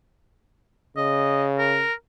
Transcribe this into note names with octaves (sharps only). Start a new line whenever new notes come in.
C#3 D#5
A#4